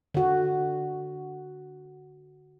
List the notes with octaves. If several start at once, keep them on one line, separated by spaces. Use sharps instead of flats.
D3 F#4